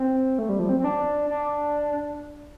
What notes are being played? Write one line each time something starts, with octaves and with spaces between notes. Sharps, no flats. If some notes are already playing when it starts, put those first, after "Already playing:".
Already playing: C4
A3
G3
F3
C4
C4
D4
D4